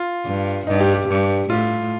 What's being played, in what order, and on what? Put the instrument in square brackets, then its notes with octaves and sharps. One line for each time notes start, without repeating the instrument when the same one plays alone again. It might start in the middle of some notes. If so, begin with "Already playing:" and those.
Already playing: [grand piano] F4
[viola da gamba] G2
[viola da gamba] G2 [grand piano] D#4
[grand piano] G4
G4
[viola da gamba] G2
[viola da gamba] A2 [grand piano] F4